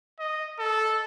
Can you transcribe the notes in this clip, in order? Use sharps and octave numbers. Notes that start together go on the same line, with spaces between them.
D#5
A4